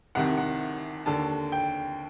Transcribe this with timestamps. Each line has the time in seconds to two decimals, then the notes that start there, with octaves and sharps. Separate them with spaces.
0.15 C2 C3 D#3 F#5
0.38 F#5
1.06 D#2 D3 A5
1.52 G5